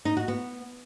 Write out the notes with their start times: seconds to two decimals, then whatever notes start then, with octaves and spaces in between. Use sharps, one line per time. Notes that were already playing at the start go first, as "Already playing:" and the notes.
0.05 D#4
0.17 F#4
0.28 B3